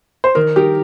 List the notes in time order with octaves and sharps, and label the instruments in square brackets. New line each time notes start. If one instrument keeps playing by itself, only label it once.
[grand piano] C5
[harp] D#3 [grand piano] A#4
[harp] G3 D#4 A#4 [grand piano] G4